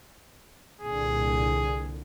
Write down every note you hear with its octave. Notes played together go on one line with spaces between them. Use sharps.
C2 A#2 D3 G#4